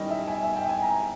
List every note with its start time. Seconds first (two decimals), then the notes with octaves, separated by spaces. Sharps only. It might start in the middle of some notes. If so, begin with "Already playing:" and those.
Already playing: D#3 G3 C#4 E4 D#5
0.10 E5
0.28 G#5
0.43 E5
0.56 G5
0.69 G#5
0.83 A#5